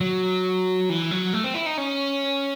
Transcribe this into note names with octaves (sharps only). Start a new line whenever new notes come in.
F#3
E3
F#3
A3
C4
E4
D#4
C#4